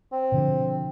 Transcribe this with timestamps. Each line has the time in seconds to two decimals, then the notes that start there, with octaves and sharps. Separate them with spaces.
0.13 C4
0.32 B2 D3 F3